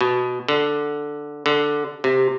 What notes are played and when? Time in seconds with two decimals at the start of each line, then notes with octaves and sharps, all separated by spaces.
0.01 B2
0.48 D3
1.46 D3
2.04 C3